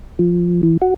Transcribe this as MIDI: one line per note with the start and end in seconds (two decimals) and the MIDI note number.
0.19 0.61 53
0.63 0.77 52
0.82 0.94 66